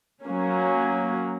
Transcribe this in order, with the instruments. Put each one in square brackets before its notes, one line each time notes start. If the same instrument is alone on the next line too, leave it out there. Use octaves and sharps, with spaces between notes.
[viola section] F#3 A#3 C#4